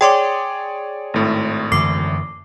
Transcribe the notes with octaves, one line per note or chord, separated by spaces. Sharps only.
G#4 C#5 D5 G5 C6 D6
G#1 A2
F#2 D3 E3 D6 C7